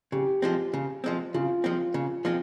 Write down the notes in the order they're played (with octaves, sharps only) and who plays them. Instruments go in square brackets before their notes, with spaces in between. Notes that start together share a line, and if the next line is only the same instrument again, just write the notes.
[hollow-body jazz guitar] C#3 [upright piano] G4
[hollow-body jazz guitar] F3 G#3 C4
C#3
F3 G#3 C4
[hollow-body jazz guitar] C#3 [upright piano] F4
[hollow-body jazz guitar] F3 G#3 C4
C#3
F3 G#3 C4